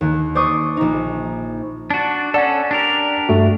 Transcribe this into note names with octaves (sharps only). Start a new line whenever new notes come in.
D#2
C5 D5 C#6 D#6
A#1 D#4
D4 F#4
C#4 A4 D5 F#5
D4 G4 A#4
G2 A3 F#4